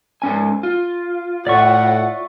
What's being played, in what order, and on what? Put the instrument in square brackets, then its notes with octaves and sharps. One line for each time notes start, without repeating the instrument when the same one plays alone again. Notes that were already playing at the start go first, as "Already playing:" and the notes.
[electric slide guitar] G#2 C#4 G#5
F4
[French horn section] A2 [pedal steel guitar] D5 E5 C#6 [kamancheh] F#5